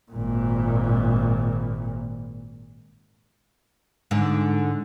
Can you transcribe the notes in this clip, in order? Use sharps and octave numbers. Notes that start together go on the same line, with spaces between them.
G#1 A#2
G#2 D3